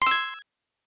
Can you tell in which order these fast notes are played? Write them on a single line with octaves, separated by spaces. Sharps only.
C6 E6 G#6